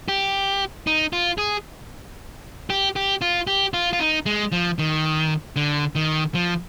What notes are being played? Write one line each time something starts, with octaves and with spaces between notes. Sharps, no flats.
G4
D#4
F4
G#4
G4
G4
F4
G4
F4
F4
D#4
G#3
F3
D#3
D3
D#3
F3